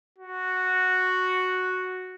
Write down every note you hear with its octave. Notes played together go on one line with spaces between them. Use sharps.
F#4